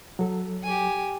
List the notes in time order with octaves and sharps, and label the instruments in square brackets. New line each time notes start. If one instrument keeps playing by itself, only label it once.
[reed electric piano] F#3 A4
[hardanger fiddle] G4 G#5